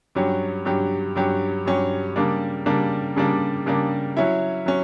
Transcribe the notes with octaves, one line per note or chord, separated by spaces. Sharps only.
G2 F#3 C#4 G4
G2 F#3 C#4 G4
G2 F#3 C#4 G4
G2 F#3 C#4 G4
C#3 G3 A#3 D4
C#3 G3 A#3 D4
C#3 G3 A#3 D4
C#3 G3 A#3 D4
F#3 C#4 E4
F#3 C#4